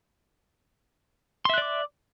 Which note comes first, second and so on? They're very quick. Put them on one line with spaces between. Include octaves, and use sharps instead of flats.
C6 E5 F#6 D5 D6